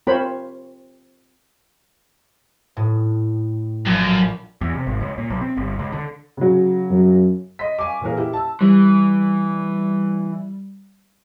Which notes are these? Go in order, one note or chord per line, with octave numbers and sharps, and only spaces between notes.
C4 F4 A#4 C5 C#5 B5
A2
A#1 F#2
E2
C3
G#1
C#2
A#2
B1
C4
G1
C#2
D3
C#3 F#3
F#2
D#5 C6 B6
F5 G#5 C#6 D6
A#2 E3 A#3 G#4 A#4
E4 G4 E5
A5 E6
E3 G3